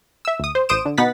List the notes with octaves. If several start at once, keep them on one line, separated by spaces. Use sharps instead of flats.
E5 E6
D2 D#6
C5
A1 C5 D#6 D7 E7
D3
B2 B3 D#4 F#5 A6 B6